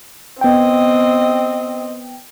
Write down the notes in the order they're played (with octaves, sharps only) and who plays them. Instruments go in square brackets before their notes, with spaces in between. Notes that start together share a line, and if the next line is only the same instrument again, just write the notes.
[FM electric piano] B3 G5 [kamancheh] C4 D#5